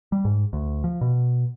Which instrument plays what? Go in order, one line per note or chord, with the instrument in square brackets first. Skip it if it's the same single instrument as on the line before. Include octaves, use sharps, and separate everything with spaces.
[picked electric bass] G3
G#2
D2
F3
B2